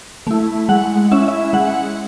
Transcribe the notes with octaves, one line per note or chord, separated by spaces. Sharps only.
A3 E4
G#3 F#5
C#4 E4 E5
E5
G#3 F#5